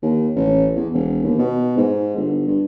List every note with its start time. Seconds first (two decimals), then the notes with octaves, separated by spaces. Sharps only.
0.02 D#2
0.36 A1
0.76 E2
0.94 E1
1.24 D#2
1.38 B2
1.77 G#2
2.16 G1
2.47 G2